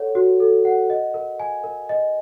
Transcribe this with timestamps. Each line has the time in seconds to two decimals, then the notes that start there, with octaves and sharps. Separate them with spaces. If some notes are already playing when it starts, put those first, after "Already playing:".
Already playing: A4 C#5 F#5
0.15 F#4
0.40 A4
0.65 F#5
0.90 D#5
1.14 A#4
1.40 G#5
1.64 A#4
1.89 D#5